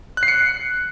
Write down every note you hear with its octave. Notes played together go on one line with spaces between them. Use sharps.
F#6
C7
C#7